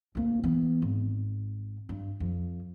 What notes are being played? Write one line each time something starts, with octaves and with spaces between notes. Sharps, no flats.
D2 A#3
E3 B3
G#1
G2
F2